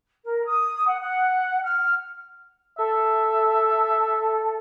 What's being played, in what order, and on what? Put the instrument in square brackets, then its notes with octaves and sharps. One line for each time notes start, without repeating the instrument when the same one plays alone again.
[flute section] A#4
D#6
F#5
F#5
F6
[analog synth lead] A4 [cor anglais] E5